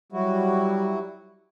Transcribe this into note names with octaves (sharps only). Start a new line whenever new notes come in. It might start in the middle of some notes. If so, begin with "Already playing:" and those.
F#3 G3 E4 F#4